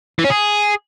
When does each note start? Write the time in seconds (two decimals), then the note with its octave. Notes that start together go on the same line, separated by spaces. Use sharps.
0.19 E3
0.24 C#4
0.30 G#4